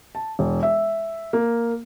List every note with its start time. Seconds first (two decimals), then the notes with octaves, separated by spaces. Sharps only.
0.15 A5
0.39 E1
0.63 E5
1.33 A#3